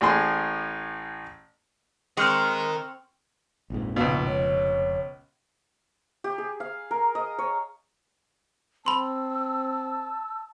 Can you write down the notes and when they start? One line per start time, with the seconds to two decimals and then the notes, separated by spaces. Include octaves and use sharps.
0.01 A1 A2 G#4 C6
2.17 G#3 C4 A#4 D#5 C#6 F6 F#6
3.70 A#1 F2 G#2
3.96 C#2 B2 F5
4.27 F1 C#5
6.24 G4
6.38 G#4
6.60 F5
6.91 A#4
7.15 D#5
7.39 C#5
8.86 C4 A5 B5 C6 E6